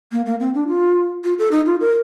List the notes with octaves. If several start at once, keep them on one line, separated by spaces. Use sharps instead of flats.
A#3
A#3
C4
D4
F4
F4
A4
D#4
F4
A#4